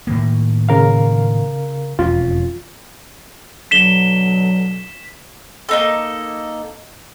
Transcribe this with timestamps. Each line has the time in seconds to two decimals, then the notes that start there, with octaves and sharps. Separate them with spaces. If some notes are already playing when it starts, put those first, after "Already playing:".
0.07 A2 D#3 A#3
0.69 C#3 A#4 F5
1.99 E1 F2 C#4 F4
3.71 B2 D3 F#3 B6 E7 G7
5.69 A#3 D#4 A4